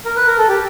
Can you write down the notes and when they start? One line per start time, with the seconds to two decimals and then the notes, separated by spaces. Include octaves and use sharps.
0.05 A#4
0.16 B4
0.27 A#4
0.38 A4
0.49 G4